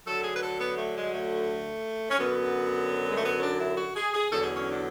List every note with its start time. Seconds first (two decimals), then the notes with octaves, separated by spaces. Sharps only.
0.06 D2 D3 F#3 A4
0.23 G#4
0.34 B4
0.42 A4
0.59 B3
0.76 A3
0.95 G#3
1.12 A3
2.10 C#4
2.18 F#2 D3 F#3 B3
3.09 G#3
3.17 A3
3.24 B3
3.37 C#4
3.42 D4
3.60 E4
3.77 F#4
3.96 G#4
4.13 G#4
4.30 E2 D3 F#3 A4
4.43 G#4
4.57 C#4
4.70 D4